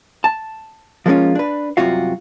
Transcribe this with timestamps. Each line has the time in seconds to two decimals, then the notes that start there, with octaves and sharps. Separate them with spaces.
0.24 A5
1.06 F3 G#3 A#3 B3 C#4 F4
1.35 D4 B4
1.77 C2 F#2 C3 F4 F#4 F5